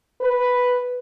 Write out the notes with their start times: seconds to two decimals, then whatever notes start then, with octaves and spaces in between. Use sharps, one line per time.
0.21 B4